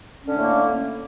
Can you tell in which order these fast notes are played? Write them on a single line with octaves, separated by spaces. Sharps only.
C#4 D3 A3 A2 A#3